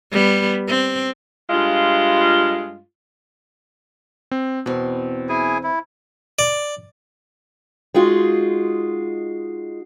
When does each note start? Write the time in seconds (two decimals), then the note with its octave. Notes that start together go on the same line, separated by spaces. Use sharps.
0.12 G3 B3
0.68 C4
1.50 G2 G#3 F4
4.31 C4
4.66 E2 B2 C4
5.29 E4 G#4 G#5
5.63 E4
6.39 D5
7.94 G#3 D#4 F4 F#4